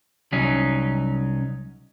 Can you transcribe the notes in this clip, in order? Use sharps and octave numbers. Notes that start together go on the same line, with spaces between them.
C2 F#3 C#4 D#4